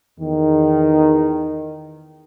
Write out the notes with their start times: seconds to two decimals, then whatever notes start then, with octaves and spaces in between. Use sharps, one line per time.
0.19 E2 D#3